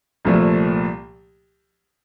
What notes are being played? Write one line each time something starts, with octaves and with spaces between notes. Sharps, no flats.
C2 A#2 F3 A3